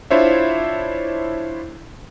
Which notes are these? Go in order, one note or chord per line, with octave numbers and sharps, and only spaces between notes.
D4 E4 F4 C5 C#5 E5